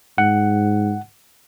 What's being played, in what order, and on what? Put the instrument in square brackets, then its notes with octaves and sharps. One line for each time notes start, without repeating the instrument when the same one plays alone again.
[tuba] G#2 [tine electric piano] F#5